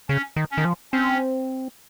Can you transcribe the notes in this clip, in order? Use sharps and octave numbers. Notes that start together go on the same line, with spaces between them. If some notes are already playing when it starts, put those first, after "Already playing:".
C#3 C#4
D#3
C#4
D#3
F3
C4 C#4